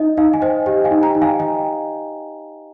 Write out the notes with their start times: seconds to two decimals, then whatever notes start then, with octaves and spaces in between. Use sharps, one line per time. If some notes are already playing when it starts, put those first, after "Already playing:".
Already playing: D#4 D#5
0.17 D#4 F5
0.34 G#5
0.42 C5 D#5 G5
0.66 G4 D#5 G5
0.84 F5 G#5
0.91 D#4
1.03 G5 A#5
1.15 D#4
1.22 F5 G#5
1.39 D#5 G5